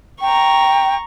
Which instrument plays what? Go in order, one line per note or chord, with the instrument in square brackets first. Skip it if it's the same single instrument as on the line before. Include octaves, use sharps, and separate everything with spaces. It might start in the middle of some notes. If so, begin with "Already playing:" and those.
[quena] G5 [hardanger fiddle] A#5 C#6